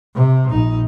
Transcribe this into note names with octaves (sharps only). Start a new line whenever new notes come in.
C3
A#1 D#4